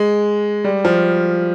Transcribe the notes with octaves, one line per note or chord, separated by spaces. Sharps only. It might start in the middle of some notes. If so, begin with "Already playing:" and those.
Already playing: G#3
G3
F3